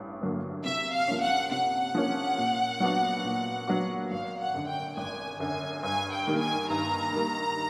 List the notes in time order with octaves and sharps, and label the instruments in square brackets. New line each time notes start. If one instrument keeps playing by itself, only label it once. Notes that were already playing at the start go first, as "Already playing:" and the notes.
Already playing: [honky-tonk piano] A1 G2
G2 D3 F#3 A#3
[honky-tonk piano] C3 [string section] E5
[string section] F5
[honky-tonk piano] F3 A#3 C#4
[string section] F#5
[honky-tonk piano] C3 [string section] F#5
[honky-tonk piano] F3 A#3 C#4
A#2
F#3 B3 D4 F#4
A#2
F#3 B3 D4 F#4
[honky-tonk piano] G#1 [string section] F5
[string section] F#5
[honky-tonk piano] F#2 D3
[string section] G5
[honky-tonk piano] G#1 [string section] G#5
[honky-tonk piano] F#2 D3 [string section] G#5
[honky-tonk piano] G2 [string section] G#5
[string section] G5
[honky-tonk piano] D#3 G3 A#3
[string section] G#5
[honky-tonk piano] G2 [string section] A#5
[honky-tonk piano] D#3 G3 A#3